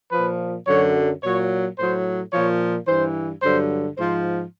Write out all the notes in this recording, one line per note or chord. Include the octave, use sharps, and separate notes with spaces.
A#2 F3 B4
F#2 D3 F#3 C#5
A#2 F#3 C#5
A2 F#3 C5
A#2 F3 C#5
G2 E3 C5
G2 D3 F#3 C5
G#2 F3 C5